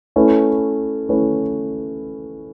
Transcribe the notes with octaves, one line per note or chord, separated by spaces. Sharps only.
A3 C#4 E4 B4
A3 C#4 E4 B4